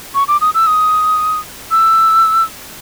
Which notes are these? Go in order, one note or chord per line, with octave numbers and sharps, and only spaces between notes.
C#6
D6
D#6
E6
D#6
E6